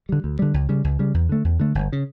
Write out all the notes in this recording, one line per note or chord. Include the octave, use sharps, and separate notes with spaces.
D3 G3
D2
D3 G3
C#2
C#3 G3
C#2
C#3 G3
E2
D3 A3
E2
D3 A3
G1
C#3